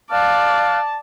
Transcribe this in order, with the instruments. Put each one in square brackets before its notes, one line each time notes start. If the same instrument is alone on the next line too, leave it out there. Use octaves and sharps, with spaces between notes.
[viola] D5 [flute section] F5 F6 F#6 [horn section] A5